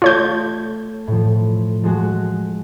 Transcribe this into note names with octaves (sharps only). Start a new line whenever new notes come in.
A3 F4 C#5 G6
A2 F3
F3 G#3 F#4